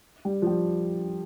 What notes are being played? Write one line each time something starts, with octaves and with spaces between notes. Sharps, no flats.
G3
F3
G3